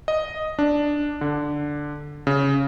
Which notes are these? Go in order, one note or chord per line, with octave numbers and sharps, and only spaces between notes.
D#5
D4
D3
C#3